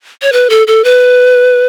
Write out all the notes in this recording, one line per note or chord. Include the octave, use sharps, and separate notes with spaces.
C#5
B4
A4
A4
B4